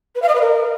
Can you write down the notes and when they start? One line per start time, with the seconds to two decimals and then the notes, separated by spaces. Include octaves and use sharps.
0.16 B4
0.22 F5
0.29 D#5
0.35 B4
0.42 A#4